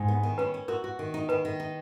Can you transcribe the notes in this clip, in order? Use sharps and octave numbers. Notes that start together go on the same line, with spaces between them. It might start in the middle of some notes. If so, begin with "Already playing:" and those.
Already playing: G#2 G#5
B3
D#3
C#4 B4
C#4
F#4 A#4
F#4
D#3
D#4
D#3 B4
D#3
D#4